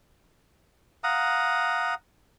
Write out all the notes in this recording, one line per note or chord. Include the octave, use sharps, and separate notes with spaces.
F5 F#5 A#5 D#6